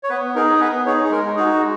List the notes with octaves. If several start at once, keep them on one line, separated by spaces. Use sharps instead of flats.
C#5
B3 B4
D#4 G#4 A#4
B3 B4
D#4 G#4 C#5
G#4
G#3 A#4
D#4 F#4 G#4
G#3